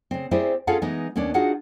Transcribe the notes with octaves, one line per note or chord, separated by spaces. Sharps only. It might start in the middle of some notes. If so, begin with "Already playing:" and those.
C#3 C4
C4 E4 G4 G#4 C5 D5
C#4 F4 G#4 A4 F5 F#5
E3 G#3 B3 D#4
D#2 B3 C#4 D4 D5
D4 D#4 F4 F#4 G#4 F#5